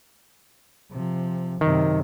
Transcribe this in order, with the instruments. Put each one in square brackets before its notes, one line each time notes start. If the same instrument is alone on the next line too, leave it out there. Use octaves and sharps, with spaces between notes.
[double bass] C3 F3
[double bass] F#2 C3 [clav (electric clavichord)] D#3